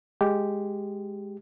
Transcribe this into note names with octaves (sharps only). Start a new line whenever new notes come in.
G#3 G4